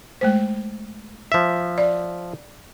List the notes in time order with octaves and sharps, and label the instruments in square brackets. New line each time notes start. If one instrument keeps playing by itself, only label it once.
[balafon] G#3 A3 C5
[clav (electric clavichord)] F3 E5
[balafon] D5